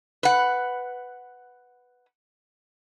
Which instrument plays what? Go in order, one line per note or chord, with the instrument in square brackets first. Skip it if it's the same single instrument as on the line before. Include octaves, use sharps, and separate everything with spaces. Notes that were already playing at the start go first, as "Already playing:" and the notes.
[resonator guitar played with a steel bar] B4 F#5